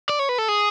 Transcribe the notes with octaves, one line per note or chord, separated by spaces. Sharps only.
D5
C#5
B4
A4
G#4